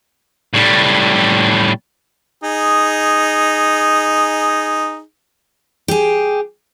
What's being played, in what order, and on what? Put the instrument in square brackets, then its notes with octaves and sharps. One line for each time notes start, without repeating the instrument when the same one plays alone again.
[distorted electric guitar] A2 G3
[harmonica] D#4 G#4
[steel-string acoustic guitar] G4 G#4